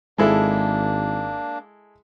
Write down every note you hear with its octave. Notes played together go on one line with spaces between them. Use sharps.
G#1 G#3 A#3 D4 E4 A4